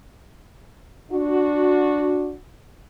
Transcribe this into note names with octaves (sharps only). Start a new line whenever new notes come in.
D4 F#4